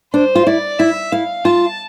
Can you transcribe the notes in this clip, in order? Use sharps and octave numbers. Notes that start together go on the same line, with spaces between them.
D4 C5
F4
E4 D5
E4 E5
E4 F5
F4 A5